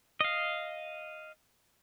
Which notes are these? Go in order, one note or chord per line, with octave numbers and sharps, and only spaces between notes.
D#5 F5